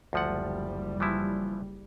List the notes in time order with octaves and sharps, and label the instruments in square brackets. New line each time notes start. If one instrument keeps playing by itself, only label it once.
[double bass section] F#1 G3 [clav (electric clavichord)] D2 F3 F#5
[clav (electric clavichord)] E3 F3 E4